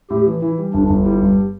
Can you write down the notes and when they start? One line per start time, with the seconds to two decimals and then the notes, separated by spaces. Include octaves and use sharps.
0.10 A2 G4
0.27 E3
0.42 E3 E4
0.58 G3
0.73 G1 D4
0.90 G1
1.05 G3 E4
1.22 G2